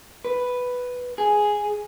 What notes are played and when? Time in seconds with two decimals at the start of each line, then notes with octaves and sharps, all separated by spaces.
0.25 B4
1.18 G#4